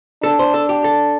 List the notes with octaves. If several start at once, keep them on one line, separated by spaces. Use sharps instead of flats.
D4 A4
C5
A4
G4
A4